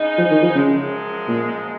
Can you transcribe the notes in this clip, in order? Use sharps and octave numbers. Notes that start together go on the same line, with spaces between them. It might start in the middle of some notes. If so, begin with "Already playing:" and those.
Already playing: C#3 G#3 D#4
F3
D#3
F3
F#2 C#3 F3 G#3
A#2